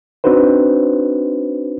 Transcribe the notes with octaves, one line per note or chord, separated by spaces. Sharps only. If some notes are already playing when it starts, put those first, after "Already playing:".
C4 D4 D#4 F#4 B4 C5